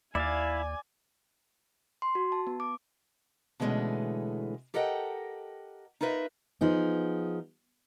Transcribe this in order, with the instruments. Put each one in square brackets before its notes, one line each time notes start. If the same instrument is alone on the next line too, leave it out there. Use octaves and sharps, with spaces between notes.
[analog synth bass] D#2 [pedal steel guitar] E4 E5 F5 [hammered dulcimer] D5 [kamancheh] G#5
[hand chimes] C6
F#4
A5
B3
D6
[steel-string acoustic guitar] B2 D3 E3 G#3 A3 C#4
G4 A4 A#4 D#5 F#5 G5
D#4 F4 A#4 B4 E5
F3 B3 D#4 G#4